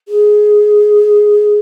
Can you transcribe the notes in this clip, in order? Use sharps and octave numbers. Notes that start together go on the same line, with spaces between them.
G#4